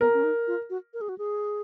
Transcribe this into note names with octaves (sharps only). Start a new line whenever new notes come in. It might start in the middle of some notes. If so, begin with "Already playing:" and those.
B3 A#4
C#4
D#4
F4
F#4
A#4
G#4
F#4
G#4